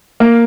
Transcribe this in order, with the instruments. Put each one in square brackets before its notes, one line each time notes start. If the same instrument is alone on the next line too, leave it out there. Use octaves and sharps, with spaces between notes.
[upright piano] A#3